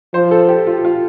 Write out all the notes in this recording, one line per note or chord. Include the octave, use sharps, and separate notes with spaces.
F3 C5
A4
G4
F4
F4